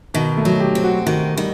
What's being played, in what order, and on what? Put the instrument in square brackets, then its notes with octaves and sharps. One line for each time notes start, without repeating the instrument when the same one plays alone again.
[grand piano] B2 [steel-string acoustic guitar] D#3
[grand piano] A3
[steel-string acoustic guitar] F#3
[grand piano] G4
[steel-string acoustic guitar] C4
[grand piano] F#4
[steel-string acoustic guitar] D#3 [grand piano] F#4
[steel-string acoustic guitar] D#3 [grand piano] G3